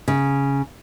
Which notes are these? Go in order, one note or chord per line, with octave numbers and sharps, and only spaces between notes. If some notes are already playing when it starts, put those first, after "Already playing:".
C#3